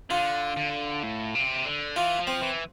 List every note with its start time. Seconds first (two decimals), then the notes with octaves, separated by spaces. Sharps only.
0.10 D3 F4
0.57 D3
1.03 A2
1.35 C3
1.66 D3
1.96 E3 F4
2.20 F3
2.27 C4
2.42 E3